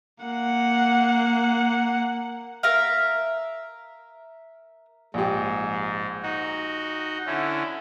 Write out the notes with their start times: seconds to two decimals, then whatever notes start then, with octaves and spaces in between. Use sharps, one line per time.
0.24 A#3 F#5
2.63 A#4 E5 F5
5.14 A#1 G#2 G4
6.23 D#4 F#4
7.26 D3 C#4 E4